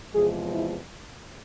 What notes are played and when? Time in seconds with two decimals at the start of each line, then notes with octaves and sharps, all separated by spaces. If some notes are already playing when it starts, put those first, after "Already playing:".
0.14 E2 C3 F3 G#3 G#4
0.54 E4